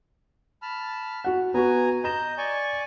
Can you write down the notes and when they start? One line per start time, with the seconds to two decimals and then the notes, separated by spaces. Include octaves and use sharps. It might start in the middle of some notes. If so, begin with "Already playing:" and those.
0.62 A5 B5 F6
1.24 F#4 F#5
1.54 B3 F#4 G#5 A#5
2.04 D#5 A#5 G6 E7
2.38 D5 G#5 C#6